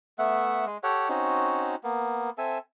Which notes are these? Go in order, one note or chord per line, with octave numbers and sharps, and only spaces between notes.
A3 B3 E5 F#5
G#3
G4 A4 C#5 F#5
C4 C#4 D#4 F#4
A#3 B3
C4 A4 E5 G#5